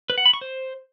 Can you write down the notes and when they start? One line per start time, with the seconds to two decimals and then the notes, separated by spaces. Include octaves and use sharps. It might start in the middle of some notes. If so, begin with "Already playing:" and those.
0.10 B4
0.18 F#5
0.26 B5
0.33 C#6
0.41 C5